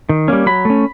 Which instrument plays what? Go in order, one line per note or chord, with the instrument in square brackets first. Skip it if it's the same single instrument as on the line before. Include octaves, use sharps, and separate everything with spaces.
[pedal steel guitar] D#3
G3 A#3 C#4
F#3 B5
A3 C#4